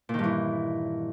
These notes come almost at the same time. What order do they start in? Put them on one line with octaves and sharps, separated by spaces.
A#2 D#3 G2 E3